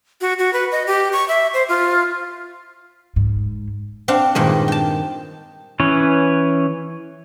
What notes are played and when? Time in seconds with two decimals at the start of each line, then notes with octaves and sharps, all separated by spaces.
0.21 F#4
0.39 F#4
0.53 B4
0.72 D#5
0.87 G4
1.13 C#6
1.28 E5
1.54 C5
1.69 F4
3.16 G#2
4.08 C4 D4 F5 F#5
4.35 G2 A#2 D#3 G#3
4.68 G5 A5
5.80 E3 C#4 B4 C#5